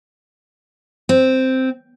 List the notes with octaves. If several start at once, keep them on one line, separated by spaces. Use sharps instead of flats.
C4